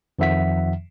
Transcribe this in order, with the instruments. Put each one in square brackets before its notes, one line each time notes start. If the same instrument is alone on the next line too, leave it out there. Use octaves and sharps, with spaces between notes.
[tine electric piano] F2 D#3 F3 E5 F#5 B6